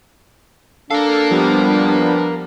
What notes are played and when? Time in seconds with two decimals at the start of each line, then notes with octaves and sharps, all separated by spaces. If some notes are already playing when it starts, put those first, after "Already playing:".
0.91 D4 A4 A#4 F5
1.31 F3 G3 B3